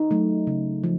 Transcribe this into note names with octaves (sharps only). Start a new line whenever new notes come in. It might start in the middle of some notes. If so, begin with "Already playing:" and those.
Already playing: D#4
F#3 A3
C#3
F3